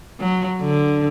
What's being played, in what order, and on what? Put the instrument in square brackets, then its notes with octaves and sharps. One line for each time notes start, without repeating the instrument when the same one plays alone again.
[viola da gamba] F#3
D3